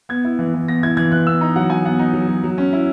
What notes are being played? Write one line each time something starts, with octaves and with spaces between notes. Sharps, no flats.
B3 G#6
E4
E3
E3
B3 A#6
E4 G#6
E3 G#6
E3 F#6
B3 E6
D#4 A#5
F#3 F#5
F#3 G#5
B3 F#5
D#4
F#3
F#3
F#3
C#4
E4